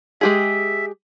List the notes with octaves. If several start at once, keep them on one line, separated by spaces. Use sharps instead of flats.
G#3 G4 G#4 E5